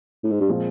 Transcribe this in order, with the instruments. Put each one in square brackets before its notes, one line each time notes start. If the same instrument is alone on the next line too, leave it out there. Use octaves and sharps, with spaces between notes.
[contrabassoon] A2
G#2
G2
[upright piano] A#2 F3 G#3 C4 F4